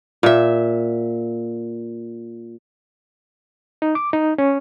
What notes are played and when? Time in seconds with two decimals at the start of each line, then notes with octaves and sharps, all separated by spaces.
0.23 A#2 E5
3.82 D#4
3.95 D6
4.13 D#4
4.38 C#4